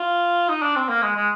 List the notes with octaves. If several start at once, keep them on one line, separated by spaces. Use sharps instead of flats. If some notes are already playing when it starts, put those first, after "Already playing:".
Already playing: F4
D#4
D4
C4
A#3
G#3
G#3